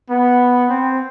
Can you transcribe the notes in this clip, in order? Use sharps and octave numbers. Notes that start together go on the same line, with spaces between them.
B3
C4